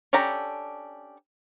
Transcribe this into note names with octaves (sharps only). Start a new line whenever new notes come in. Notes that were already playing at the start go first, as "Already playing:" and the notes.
C#4 D4 G4 A4 A#5